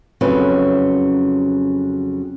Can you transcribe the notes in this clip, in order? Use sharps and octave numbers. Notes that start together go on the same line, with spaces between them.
F2 C#3 F#3 C#4 E4 B4